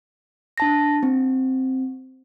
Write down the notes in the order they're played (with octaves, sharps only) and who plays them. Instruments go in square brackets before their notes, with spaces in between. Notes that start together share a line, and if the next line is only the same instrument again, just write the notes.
[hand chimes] D4 A5 A#6
C4